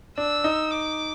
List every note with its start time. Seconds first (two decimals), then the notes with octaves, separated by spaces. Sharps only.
0.18 D4 E6
0.44 D#4
0.71 D6